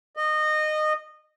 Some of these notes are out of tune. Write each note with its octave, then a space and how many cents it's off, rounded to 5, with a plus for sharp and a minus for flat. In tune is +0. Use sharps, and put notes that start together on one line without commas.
D#5 -20